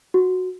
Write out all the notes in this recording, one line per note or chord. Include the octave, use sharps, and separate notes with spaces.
F#4